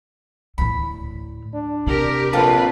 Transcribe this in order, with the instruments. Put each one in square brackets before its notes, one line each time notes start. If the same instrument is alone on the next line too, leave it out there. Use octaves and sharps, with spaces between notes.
[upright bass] D2 A2 [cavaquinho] B5
[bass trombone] D4
[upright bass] C3 [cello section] G4 A#4
[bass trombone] A#1 [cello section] C4 F4 B4 [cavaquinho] A4 F5 G5